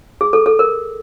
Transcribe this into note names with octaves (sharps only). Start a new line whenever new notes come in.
G#4
A4
A4
A#4